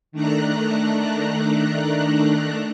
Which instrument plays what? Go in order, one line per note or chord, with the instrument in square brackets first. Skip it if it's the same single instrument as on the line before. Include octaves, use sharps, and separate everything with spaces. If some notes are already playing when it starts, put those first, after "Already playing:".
[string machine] D#3 A3 D4 A#5 F#6